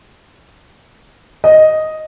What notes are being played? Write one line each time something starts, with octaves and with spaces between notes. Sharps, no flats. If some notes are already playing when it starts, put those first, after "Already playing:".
D#5